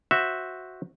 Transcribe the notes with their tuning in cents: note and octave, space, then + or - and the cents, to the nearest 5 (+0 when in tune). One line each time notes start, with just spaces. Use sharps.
F#4 +0 C5 +0 E5 -5